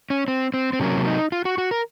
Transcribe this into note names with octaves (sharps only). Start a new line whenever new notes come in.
C#4
C4
C4
C4
C3 F#3 A#3 C#4
D#4
F4
F#4
F#4
A#4